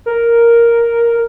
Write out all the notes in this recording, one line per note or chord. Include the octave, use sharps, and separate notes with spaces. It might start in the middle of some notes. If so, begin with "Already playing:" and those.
A#4